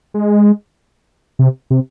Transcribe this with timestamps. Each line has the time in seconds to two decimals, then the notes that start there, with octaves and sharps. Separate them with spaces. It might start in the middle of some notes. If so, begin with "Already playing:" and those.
0.14 G#3
1.39 C3
1.70 C3